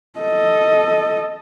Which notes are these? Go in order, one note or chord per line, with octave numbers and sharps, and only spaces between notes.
A4 D#5